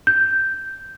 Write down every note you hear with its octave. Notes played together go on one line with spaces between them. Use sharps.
G6